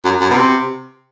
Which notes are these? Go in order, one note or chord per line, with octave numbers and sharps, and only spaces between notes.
F#2
F#2
B2
C3